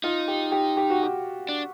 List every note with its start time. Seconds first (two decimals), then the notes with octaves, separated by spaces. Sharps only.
0.04 D#4 F4
0.28 G4
0.52 G4
0.77 G4
0.90 F#4
1.03 G4
1.49 D4